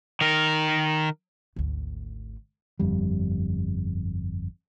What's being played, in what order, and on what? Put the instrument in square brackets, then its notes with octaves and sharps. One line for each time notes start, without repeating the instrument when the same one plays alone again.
[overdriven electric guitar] D#3 A#4
[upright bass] G#1 D2
[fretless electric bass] G1 F2 G3